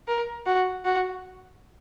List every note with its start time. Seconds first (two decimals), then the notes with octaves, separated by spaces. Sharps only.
0.08 A#4
0.46 F#4
0.85 F#4